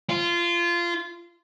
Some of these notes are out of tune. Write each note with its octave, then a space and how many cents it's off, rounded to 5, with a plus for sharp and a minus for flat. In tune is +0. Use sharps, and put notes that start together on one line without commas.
F4 -20